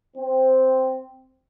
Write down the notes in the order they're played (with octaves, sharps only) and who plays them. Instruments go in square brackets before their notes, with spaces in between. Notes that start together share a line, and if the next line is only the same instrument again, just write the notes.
[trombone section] C4